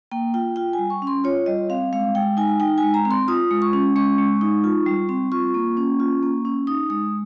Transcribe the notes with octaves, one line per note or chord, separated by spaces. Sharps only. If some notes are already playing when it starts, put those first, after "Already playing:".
A#3 G5
F4 G5
F4 G5
G#5
G3
C#6
C#4
C6
F4 C#5
G3 D#5
C4 F5
G#3 F5
G#3 G5
D#4 G#5
D#4 G5
G#5
G#3
A#5
C4
C6
F4 D#6
G#3
C#6
C#4
G#3 C#6
G#3
D#4
F4
G3
C4
F4 C#6
A#3
C#4
F4
A#3
C#4
D#4 D#6
G#3 D#6